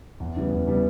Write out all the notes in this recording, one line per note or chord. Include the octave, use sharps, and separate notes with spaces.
E2
C#3 E3 G3 B3
E2
C#3 E3 G3 B3